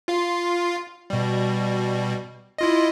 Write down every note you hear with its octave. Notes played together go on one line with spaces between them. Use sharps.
F4 F5
B2 G3
E4 F4 D#5